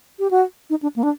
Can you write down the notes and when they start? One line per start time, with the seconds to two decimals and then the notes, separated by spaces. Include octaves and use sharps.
0.19 G4
0.31 F#4
0.70 D#4
0.82 D4
0.96 A#3
1.03 D4